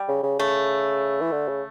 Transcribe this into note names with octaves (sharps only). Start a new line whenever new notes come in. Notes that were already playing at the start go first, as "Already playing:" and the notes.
Already playing: G3
C#3
C#3
C#3 A3
E3
D3
C#3